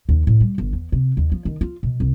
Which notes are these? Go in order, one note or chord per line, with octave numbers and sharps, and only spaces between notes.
D#2
A2
G3
G1
E2
C3
D#2
F3
D#3
F4
B2
C2